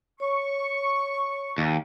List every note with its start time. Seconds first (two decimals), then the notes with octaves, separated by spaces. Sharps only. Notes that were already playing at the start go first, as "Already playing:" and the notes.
0.20 C#5 C#6
1.58 D#2